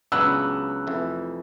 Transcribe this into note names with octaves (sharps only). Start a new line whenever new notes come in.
C#2 C#3 F#3 B3 D4 E6 F#6
F2 C3 E3 A3